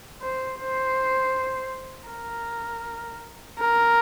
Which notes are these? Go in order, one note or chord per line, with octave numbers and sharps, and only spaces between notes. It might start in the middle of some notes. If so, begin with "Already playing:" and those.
C5
C5
A#4
A#4